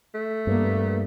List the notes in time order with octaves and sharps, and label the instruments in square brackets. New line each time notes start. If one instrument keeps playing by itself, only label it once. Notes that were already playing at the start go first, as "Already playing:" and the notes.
[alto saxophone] A3
[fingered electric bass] G2 [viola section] A#3 B3